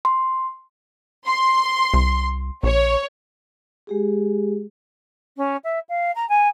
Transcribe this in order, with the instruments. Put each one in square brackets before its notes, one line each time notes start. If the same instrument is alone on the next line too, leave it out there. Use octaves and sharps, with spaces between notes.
[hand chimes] C6
[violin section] C6
[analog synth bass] C2
[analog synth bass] A#1 [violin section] C#5
[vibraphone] G#3 G4 G#4
[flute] C#4
E5
F5
A#5
G#5